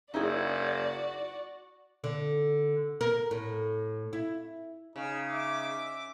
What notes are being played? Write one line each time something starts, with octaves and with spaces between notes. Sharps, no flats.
F#1 D#4 E4 F#4 G#4 D5
D3
A#4
A2
E4
C#3 D#4
E5 D6